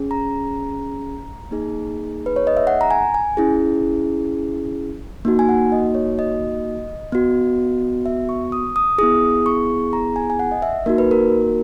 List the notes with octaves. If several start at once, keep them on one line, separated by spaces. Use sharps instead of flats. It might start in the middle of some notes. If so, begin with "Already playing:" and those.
Already playing: C#4 G#4
A#5
A#3 D#4 G#4
B4
C#5
D#5
E5
F#5
A#5
G#5
G#5
C#4 E4 G#4
A#3 D#4 F#4
G#5
F#5
D#5
C#5
D#5
B3 F#4
E5
C#6
D#6
D#6
B3 E4 G#4 D#6
C#6
A#5
G#5
G#5
F#5
D#5
E5
A#3 D#4 F#4 A#4
B4
A#4